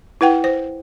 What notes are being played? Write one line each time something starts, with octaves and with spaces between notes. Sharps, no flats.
E4 B4 F#5 G5
C5